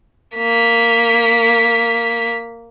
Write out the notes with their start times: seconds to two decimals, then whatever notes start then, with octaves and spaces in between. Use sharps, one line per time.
0.37 A#3 B6